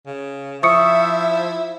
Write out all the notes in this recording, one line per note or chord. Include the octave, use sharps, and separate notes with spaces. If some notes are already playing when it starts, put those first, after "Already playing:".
C#3
F3 E4 E5 C#6 D#6 C#7